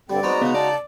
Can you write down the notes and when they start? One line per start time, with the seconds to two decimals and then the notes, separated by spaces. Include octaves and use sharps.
0.10 G2 D3 G3 C4 D5
0.23 G#3 B3 C4 D#4 F#4 A#5
0.42 C#3 B3 D#4
0.55 D5 A5